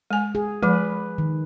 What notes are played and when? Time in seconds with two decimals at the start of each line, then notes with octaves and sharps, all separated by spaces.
0.11 G#3 G#5
0.35 G#4
0.63 F3 G#3 B4
1.18 D#3